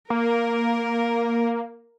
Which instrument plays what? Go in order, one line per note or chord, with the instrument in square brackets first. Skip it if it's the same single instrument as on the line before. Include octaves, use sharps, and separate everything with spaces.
[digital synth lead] A#3 [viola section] A#4